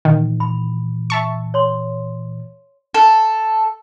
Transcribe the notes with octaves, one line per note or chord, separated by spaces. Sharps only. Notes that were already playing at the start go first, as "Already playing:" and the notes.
A#2 D#3 E3
B5
E5 A5 C#6
C#5 C6
A4